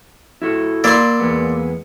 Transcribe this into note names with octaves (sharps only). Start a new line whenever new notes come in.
E4 F#4 A4
A#3 A#4 D5 C6 E6
E2 G#3 B3